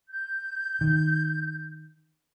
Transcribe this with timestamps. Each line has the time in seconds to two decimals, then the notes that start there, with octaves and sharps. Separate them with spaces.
0.09 G6
0.81 D#3